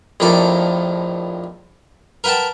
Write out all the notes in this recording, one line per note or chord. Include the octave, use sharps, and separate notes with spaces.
A#1 F2 A2 D#3 D5 D6
A#4 B4 F#5 G5 A5